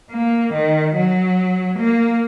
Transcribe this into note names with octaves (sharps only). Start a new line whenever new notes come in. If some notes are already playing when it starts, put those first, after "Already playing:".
A#3
D#3
F#3
A#3